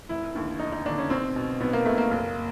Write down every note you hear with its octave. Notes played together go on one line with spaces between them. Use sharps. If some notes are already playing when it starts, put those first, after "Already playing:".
F1 E4
D#2 D3
F1 D#4
D#4
D#2 D3 D4
C#4
B1 C4
B2
B1 B3
A#3
B2 A3
A#3
F#1